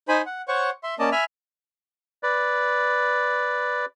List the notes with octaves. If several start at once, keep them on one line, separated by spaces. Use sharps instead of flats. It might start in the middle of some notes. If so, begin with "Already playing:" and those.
D#4 C5 G#5 B5
F#5
C5 C#5 F#5 C#6
E5 C6
A#3 C#4 D5 D#5 A5
E5 G#5 B5 F6
B4 D5